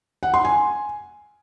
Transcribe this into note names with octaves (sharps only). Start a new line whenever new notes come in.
F#5
C6
G#5